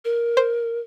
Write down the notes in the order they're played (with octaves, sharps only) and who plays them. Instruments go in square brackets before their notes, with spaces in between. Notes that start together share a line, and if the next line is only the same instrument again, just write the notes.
[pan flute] A#4
[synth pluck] C5